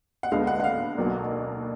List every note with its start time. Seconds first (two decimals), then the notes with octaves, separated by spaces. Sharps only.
0.23 F#5
0.31 D2 D3 G#3 B3 F5
0.47 F#5
0.60 F#5
0.64 F5
0.97 B1 B2 F#3 A#3 D4